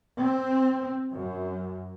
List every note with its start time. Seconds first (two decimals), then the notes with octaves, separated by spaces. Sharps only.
0.19 C4
1.13 F#2